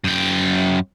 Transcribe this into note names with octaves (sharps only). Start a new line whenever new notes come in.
F#2 G5